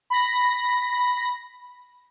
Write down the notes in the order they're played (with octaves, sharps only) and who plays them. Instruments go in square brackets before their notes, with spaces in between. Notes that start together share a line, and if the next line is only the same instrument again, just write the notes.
[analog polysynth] B5 A#6